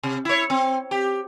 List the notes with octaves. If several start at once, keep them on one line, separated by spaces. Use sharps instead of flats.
C3
E4 C#5
C4
G4